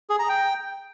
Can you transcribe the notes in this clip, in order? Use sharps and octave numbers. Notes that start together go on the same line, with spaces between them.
G#4
A#5
G5